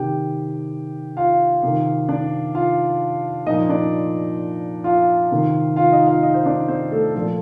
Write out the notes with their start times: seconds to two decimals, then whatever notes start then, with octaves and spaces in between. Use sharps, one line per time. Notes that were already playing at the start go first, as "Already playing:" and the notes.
Already playing: C3 D#3 G4 G5
1.17 F4 F5
1.63 C3 D#3
2.09 D4 D5
2.55 F4 F5
3.46 A#2 F3 D#4 D#5
3.69 D4 D5
4.84 F4 F5
5.31 C3 D#3
5.76 F4 F5
5.92 D#4 D#5
6.07 F4 F5
6.23 D#4 D#5
6.34 C5
6.46 D4 D5
6.68 C4 C5
6.92 A3 A4
7.14 A#2 F3 A3 A4